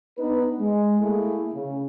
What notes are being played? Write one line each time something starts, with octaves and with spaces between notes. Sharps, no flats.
B3 D4 D#4 B4
G#3
A3 A#3 E4 G#4
C#3